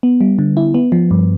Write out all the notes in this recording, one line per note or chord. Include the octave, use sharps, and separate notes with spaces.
B3
G3
D3
E4
B3
F3
G2